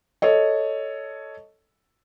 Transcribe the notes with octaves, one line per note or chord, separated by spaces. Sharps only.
A4 C#5 D#5